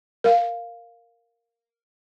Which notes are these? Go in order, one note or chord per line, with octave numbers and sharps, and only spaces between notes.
A#4 F5